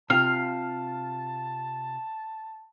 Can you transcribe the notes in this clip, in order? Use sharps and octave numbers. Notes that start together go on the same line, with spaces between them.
C3 F4 F5 A5 F6